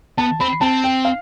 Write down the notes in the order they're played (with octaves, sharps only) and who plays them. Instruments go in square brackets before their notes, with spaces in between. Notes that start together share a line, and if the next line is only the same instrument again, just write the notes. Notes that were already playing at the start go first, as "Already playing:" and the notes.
[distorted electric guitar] B3 [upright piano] A5
[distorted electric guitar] C4 [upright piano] B5
[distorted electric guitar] C4 [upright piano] A5
[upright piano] G5
F5